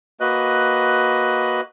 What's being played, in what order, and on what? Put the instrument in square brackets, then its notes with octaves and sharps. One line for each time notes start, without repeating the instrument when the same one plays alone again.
[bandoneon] A#3 F#4 B4 D#5 F#6